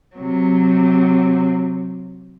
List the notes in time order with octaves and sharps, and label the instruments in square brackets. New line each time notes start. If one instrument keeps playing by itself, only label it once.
[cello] C3 F#3